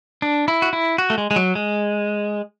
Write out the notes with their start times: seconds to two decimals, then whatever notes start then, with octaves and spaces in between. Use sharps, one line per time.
0.22 D4
0.48 E4
0.62 F#4
0.73 E4
0.98 F#4
1.10 A3
1.18 G#3
1.31 G#3
1.36 F#3
1.55 G#3